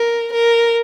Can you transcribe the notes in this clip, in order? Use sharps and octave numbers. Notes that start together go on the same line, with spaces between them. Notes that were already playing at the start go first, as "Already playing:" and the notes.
Already playing: A#4
A#4